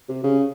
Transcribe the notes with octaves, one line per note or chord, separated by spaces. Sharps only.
C3
C#3